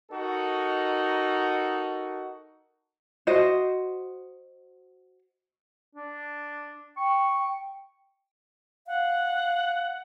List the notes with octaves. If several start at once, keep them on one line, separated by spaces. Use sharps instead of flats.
D#4 F#4 A4 A#4
F#4 C5 D#5
D4
G5 C#6
F5 F#5